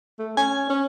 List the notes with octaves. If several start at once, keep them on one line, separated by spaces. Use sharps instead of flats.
A3
C#4 G#5
C#4